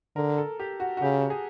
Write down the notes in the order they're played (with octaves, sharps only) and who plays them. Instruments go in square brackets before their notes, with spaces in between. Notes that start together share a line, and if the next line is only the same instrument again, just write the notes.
[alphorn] D3 [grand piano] A#4
[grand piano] A4
G4
F#4
F#4
[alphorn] C#3 [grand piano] G4
[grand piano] G#4